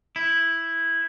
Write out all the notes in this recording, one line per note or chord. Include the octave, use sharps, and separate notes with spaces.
E4